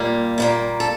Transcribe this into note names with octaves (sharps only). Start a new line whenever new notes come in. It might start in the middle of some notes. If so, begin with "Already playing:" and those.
Already playing: A#2 G3 A#3
A#2 G3 A#3
A4